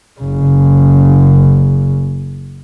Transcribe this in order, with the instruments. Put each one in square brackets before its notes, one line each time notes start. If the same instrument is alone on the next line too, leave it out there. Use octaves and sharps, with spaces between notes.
[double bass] F#1 C#3